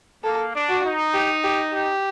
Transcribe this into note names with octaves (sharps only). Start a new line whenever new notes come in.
A#3 A4
D4
F#4
D#4
G4
G4
G4